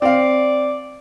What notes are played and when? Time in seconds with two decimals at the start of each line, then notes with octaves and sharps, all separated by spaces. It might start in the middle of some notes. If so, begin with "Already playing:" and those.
0.02 C4 D5 F5